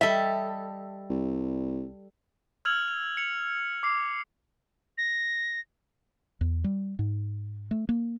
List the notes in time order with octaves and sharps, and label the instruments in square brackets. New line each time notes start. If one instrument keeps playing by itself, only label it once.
[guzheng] G3 A4 [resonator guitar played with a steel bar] D#5 E5
[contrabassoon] C2
[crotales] E6 F6 G#6 F7 F#7
F7
C#7 F7
D6 C7
[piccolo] A#6
[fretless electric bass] E2
G3
G#2
A3
A#3